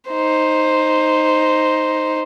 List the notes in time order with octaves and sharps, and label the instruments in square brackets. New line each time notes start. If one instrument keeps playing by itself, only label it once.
[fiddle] D#4 C5